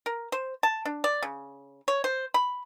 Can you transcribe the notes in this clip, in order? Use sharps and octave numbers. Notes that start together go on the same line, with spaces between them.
A#4
C5
A5
D4
D5
C#3
C#5
C5
B5